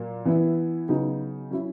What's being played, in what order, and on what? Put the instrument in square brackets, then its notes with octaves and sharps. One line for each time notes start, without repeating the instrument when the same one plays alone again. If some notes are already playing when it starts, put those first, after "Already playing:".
Already playing: [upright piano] A#2 F#3 A#3
E3 B3 E4
C#3 F#3 B3 D#4
F#3 C#4 E4